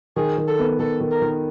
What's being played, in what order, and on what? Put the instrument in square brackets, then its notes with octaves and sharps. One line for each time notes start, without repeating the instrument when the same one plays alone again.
[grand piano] D#3 [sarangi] G#4
[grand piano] D#3
[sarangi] A4
[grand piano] B3
[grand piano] D#3 [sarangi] A4
[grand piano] D#3
[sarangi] A#4
[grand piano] D#3